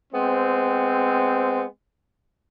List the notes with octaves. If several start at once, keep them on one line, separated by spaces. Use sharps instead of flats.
G#3 B3 C4